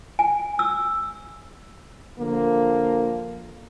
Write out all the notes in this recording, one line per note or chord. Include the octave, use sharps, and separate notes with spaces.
G#5
E6
D3 F3 A#3